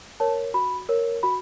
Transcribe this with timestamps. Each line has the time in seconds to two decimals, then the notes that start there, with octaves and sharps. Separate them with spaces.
0.20 A#4 C#5 A5
0.54 F#4 B5
0.89 A#4 C#5
1.23 F#4 B5